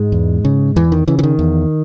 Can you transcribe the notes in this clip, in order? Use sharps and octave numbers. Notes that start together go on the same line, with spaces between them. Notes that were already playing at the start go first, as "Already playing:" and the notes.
Already playing: G#2 G#3
E2
C#3
E2 E3
D#3
C#3 E3
E3
D#3
E2